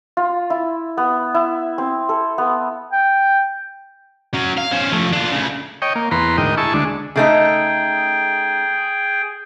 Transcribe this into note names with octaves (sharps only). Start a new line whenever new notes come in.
F4
E4
B3
E4
C4
A4
B3
G5
F#3 C#4
F5
C#4 C5
F3 A3
D4 F4
D2 C#3
C#5 D#5 G5
A#3
E2 B4 A#5 C6
D2 G#2 A#4 D#5 G5
E4 G#4 A5 C#6
D2 G#3 D4
C#3 A3 D#4 G#4 G5